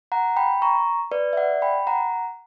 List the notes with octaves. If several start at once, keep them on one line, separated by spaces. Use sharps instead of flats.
F#5 A#5
G5 B5
A#5 C#6
B4 D5
E5
D5 F#5
G5 B5
F#5 A#5